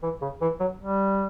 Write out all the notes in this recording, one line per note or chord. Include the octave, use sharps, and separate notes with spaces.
E3
C#3
E3
F#3
G3